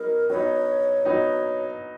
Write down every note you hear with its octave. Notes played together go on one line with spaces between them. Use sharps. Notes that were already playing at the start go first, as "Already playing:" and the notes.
Already playing: F#3 B3 D#4 A#4
F#3 B3 D#4 C#5
F#3 B3 D#4